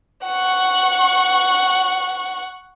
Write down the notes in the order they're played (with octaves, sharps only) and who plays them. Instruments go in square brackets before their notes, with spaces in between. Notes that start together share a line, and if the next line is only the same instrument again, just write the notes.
[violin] F#5 C#6